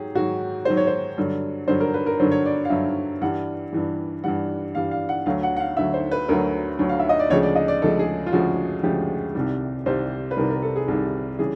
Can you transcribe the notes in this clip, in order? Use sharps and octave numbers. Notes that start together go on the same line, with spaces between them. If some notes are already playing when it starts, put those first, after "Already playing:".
Already playing: G#2 F#3 G4 G#4
G#2 D#3 F#3 F#4
G#2 D#3 F#3 C5
C#5
C5
G2 D3 F#3
G2 D3 F#3 C5
A#4
B4
A#4
G2 D3 F#3 C5
C#5
D5
F5
G2 D3 F#3 E5
G2 E3 G3 F#5
G2 E3 G3
G2 E3 G3 F#5
G2 E3 G3 F5
F5
F#5
D2 D3 F#3 F5
F#5
F#5
F5
D2 D3 F#3 E5
C5
B4
D2 D3 F#3 A#4
D2 D3 F#3
F5
E5
D#5
D5
D2 C#3 F3 G#3 C#5
D5
D#5
D5
D2 C#3 F3 G#3 A4
G#4
F4
D2 C#3 F3 G#3 F#4
D2 C#3 F3 G#3 G4
C2 C3 D#3 G3
C2 C3 D#3 G3 C5
B4
C2 C3 D#3 G3 A#4
A#4
A4
G#4
C2 C3 D#3 G3 G#4
C#3 E3 G3 G#4